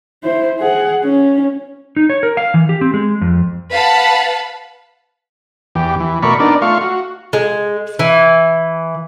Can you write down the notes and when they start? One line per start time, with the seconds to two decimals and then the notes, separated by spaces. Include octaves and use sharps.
0.23 E4 C5
0.59 G#4 F#5
1.03 C#4
1.96 D#4
2.10 C#5
2.23 A#4
2.37 F5
2.54 E3
2.69 G4
2.81 C4
2.94 G#3
3.21 F2
3.72 B4 F5 F#5 A5 B5
5.75 E2 G4
6.00 E3
6.23 B2 A3 A#4 D5 B5 C#6
6.40 B3 D4 D#4 A#4 D5
6.62 A3 F4 F5 C#6
6.81 F#4
7.33 G#3
7.99 E3